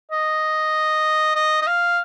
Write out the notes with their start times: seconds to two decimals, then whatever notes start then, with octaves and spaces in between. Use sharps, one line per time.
0.11 D#5
1.35 D#5
1.62 D#5
1.67 F5